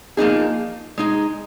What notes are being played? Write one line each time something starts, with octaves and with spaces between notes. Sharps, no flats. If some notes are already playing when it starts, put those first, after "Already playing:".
F3 A#3 D#4 G#4
G#3 D#4 G#4